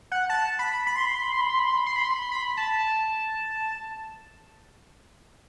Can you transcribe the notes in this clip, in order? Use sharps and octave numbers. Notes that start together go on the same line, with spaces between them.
F#5
A5
B5
B5
C6
B5
C6
B5
C6
B5
C6
B5
C6
B5
C6
B5
C6
B5
C6
B5
A5